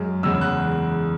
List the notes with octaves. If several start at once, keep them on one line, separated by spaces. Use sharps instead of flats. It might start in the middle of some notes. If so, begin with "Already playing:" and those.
Already playing: F#2 G#3
E2 C#3 G#3 E6
F#6